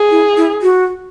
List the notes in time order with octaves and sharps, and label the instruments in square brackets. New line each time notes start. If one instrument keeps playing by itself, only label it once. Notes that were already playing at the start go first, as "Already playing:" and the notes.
Already playing: [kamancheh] G#4
[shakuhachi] E4
E4
F#4